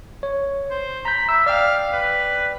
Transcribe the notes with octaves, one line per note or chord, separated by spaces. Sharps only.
C#5
C5
A#5 B5 G6
E5 E6
D5 F5 G5
B4